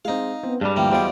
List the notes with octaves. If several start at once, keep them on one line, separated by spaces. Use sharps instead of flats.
G#3 C4 D#4 F5
B3 C4
G2 G3 G#3 D5
D2 E3 F3 A#3 G5
E2 G3 G#3 F#4 C5 D5 F5